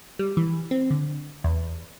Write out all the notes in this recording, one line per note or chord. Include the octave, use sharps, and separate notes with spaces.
G3
E3
C4
D3
E2